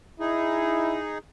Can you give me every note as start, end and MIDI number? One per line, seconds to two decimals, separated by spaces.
0.20 1.18 63
0.20 0.99 64
0.20 1.18 68